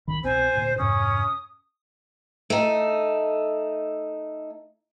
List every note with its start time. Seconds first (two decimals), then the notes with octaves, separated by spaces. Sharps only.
0.07 C2 D#3 B5
0.24 C2 B2 C4 C5 G#5
0.55 D2 A#2
0.78 F2 G#2 C3 C#4 D#6
2.50 A3 D#4